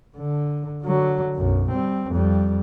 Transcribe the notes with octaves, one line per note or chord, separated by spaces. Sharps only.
D3
D3 F#3
B1 F#2
G3 C4
F2 G3